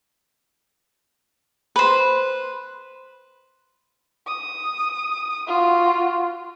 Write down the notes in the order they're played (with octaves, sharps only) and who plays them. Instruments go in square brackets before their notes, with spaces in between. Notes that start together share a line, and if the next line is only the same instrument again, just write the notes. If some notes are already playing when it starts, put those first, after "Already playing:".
[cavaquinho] B4 C5
[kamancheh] D#6
F4 F#4